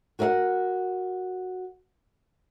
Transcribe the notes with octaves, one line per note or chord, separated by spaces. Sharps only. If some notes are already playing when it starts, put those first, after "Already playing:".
F#4 A#4 D#5 F5 F#5